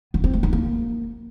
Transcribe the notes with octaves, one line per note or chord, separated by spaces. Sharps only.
B3
C4
A3
D#4
A#3